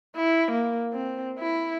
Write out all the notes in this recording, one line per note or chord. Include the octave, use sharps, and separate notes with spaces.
E4
A#3
C4
E4